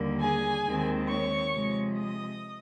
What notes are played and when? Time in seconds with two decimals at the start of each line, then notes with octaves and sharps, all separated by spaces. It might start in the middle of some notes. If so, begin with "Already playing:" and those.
Already playing: D#2 D3 G3 A#3
0.19 G#4 G#5
0.64 D#2 D#3 G#3 C4
1.09 C#5 C#6
1.54 C3 F3 G#3
1.99 D#5 D#6